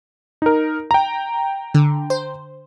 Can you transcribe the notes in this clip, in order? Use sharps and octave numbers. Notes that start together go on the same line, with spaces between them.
D#4 A#4
G5 A#5
D3
C5